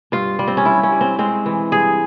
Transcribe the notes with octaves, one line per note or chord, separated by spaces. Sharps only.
G2 F4
G3
C4
C#4
G2 E4
C#4
G3
C4
G#3 C4
E3
G2 G#4